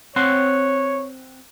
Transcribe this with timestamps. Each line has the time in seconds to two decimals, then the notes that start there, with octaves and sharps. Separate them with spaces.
0.16 C4 C#5 F#5 C6